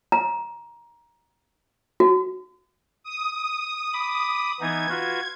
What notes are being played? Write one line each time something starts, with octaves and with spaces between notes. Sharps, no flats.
A#5
F#4
D#6
B5 D6
E3 B3 D#4 G#6
F4 F#4 B4